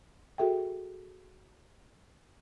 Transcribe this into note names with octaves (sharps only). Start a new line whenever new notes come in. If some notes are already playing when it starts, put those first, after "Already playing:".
F#4 G#4 A4 E5 G5